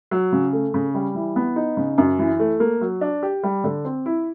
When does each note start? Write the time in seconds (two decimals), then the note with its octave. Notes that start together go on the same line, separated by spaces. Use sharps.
0.11 F#3
0.32 C#3
0.53 A3
0.74 C#3
0.94 G3
1.15 E3
1.36 B3
1.56 D#4
1.77 C#3
1.98 F#2
2.19 E3
2.40 A3
2.60 A#3
2.81 F#3
3.01 D4
3.23 G4
3.43 G3
3.64 D3
3.85 C4
4.06 E4